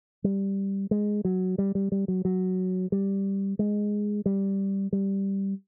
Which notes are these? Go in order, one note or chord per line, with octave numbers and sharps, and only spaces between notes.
G3
G#3
F#3
G3
G3
G3
F#3
F#3
G3
G#3
G3
G3